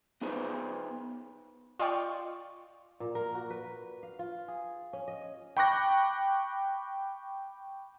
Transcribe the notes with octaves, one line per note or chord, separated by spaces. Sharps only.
B3 D#4 G#4 B4 C5
F4 D5 D#5 G5 C#6
A#2
A#4
F#4
B4
F5
F4
G#4
C#4
D#5
G5 B5 C#6 D6 F#6 A#6